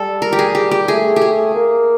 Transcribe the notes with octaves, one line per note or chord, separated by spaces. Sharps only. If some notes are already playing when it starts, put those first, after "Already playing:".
Already playing: G3 A4
A#4
G4
G#4
G4
G4
A3 G#4
G4
G#4
A#3